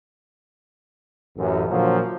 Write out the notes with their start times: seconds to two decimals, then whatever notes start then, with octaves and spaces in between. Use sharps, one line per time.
1.37 A1 F#2
1.69 A#2 D3 F3 F#3